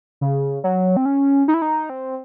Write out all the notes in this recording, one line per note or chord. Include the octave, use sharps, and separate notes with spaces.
C#3
F#3
C4
C#4
D#4
E4
D#4
C4